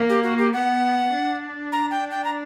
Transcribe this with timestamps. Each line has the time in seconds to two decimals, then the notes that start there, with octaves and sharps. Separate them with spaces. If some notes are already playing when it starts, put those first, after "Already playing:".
Already playing: A#3
0.09 G4
0.24 F#4
0.38 G4
0.53 B3 F#5
1.12 D4
1.72 A#5
1.91 G5
2.11 G5
2.24 A#5